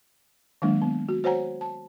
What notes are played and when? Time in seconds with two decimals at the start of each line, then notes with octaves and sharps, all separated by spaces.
0.62 D#3 F#3 G#3 A#3 D4
0.82 B3
1.09 F#4
1.24 F#4 C5 C#5 F#5 G#5 A#5
1.61 A5